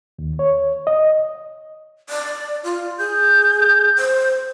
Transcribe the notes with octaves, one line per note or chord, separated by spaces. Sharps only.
D#2
C#5
D#5
D5
F4
G#4 G6
C5